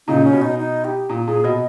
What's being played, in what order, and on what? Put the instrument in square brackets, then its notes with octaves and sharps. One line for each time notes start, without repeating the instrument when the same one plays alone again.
[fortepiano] A#2 C#3 [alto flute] D#4
[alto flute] C#4
[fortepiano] B2
[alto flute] D#4
D#4
G4
[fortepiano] A#2
[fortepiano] A#2 [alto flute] G#4
[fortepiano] B2 [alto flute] D#5